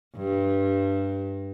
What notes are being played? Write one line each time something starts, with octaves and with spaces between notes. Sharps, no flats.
G2